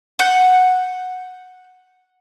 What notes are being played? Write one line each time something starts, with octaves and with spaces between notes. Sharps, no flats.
F#5 G6